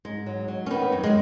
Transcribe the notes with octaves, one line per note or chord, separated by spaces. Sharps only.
G#2 G#3
F#3
F#3
C#4
D#3 B3
F#2
G#3